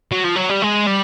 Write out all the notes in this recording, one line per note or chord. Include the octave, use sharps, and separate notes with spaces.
F#3
F3
F#3
G3
G#3
G3